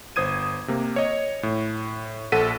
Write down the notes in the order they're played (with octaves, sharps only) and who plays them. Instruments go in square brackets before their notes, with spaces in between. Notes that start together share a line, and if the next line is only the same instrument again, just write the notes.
[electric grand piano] G1 C5 D#6 G#6 D#7
C3 A#3
C#5 D#5
A2
A#1 A4 F#5 B6 D#7